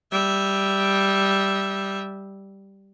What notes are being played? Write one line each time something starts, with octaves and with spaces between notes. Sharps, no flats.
G3 E5